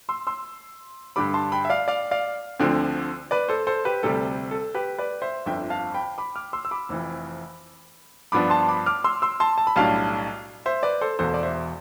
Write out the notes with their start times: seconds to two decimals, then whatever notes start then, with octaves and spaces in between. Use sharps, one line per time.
0.09 C6 E6
0.27 C6 E6
1.16 G2 D3 G3 B5 D6
1.34 A5 C6
1.52 G5 B5
1.65 E5
1.70 D5 F5
1.88 D5 F5
2.11 D5 F5
2.59 D2 D3 F3 C4
3.31 B4 D5
3.49 A4 C5
3.67 A4 C5
3.85 G4 B4
4.03 D2 C3 G3 A4
4.51 A4
4.75 G4 B4
4.98 B4 D5
5.22 C5 E5
5.46 G1 F2 D3 E5 G5
5.70 F5 A5
5.94 G5 B5
6.18 B5 D6
6.35 D6 F6
6.53 C6 E6
6.65 E6
6.71 B5 D6
6.89 F1 F2 E3
8.32 G2 F3 B3 D4 B5 D6
8.50 A5 C6
8.69 B5 D6
8.86 D6 F6
9.04 C6 E6
9.22 C6 E6
9.40 A5 C6
9.58 A5
9.67 B5
9.76 B1 A2 G3 D4 F5 A5
10.66 C5 E5
10.83 B4 D5
11.01 A4 C5
11.19 E1 E2 B2 A4 C5
11.34 D5
11.43 C5 E5